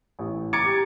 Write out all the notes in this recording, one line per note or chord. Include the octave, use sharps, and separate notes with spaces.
A1
A#5 D6 G#6 A6 C#7 D7
G4